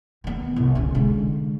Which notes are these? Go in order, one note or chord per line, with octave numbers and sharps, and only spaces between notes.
D#3 B3
C2 C3
D3 C#4
D3 G#3